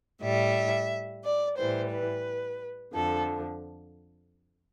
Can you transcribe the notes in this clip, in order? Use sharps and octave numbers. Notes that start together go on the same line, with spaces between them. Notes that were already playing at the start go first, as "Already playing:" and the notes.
A2 G3 E5
D5
A2 E3 G3 C5
B4
F2 D3 F3 A4